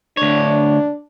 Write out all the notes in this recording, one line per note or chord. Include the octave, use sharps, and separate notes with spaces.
D2 D4 C#5